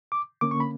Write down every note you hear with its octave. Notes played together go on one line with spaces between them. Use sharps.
D6
D3 A#3 C#4 D6
C#6
B5